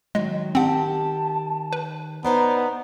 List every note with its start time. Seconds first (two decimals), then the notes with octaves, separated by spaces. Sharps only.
0.15 D#3 F#3 G#3
0.55 D#3 C4 G4 F#5 A5
1.73 B4
2.25 B3 D#4 C5 D5 A#5